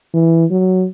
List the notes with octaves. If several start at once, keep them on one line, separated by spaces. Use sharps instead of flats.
E3
F#3